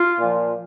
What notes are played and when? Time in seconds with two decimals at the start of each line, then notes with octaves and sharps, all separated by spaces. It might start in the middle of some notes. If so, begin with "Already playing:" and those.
Already playing: F4
0.18 A#2 F3